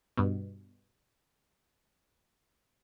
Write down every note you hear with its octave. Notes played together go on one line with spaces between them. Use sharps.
G2 B2